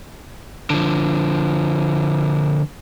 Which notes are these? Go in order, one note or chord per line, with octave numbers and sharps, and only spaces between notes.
D3 F3